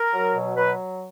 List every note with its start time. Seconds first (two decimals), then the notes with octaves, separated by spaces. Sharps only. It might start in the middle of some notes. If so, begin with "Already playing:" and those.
Already playing: A#4
0.13 F#3
0.34 B2
0.56 F#3 B4